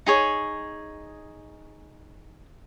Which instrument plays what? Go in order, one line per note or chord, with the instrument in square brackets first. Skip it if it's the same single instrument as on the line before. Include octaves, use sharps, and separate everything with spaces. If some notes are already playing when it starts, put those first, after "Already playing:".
[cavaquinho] D#4 G#4 C#5